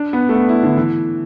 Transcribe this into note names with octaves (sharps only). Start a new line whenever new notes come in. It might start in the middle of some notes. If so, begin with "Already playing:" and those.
Already playing: D4
B3
A3
B3
E4
D3
E3